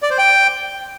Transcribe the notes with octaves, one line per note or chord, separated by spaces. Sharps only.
D5
C5
G5